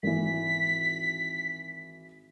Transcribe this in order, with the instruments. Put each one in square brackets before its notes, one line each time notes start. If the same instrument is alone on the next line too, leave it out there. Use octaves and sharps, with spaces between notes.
[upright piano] G#1 E3 [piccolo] B6